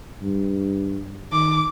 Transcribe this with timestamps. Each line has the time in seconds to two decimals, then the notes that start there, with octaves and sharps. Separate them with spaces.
0.22 G2
1.32 D#3 D6